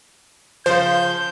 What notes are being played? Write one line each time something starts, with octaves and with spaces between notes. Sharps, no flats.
C#3 F3 C5 F5 G6